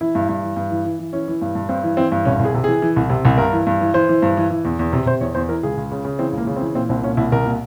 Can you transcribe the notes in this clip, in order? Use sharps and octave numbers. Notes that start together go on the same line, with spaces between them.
E3 E4
G2
G2
E3
G2
E3
E3
E3
E3 C#4
E3
G2
G2
G2 C4
E3
E3 C4
G2
C2 C#4
C2
G#4
C3
E3 G#4
E3
C2
C3
C2
G2 A#4
E3
G2
E3
E3 C5
E3
G2
E3
E3
E2
E2
C3
C3 C5
E2 C#5
E2 C5
E3 A#4
C#2 G#4
C#2
C#3
C#3
E3 C4
C#2 A#3
C#3
C4
E3
A#2 C4
C2 C4
A#2 C#4
C2 E4
C2 A#4
A#2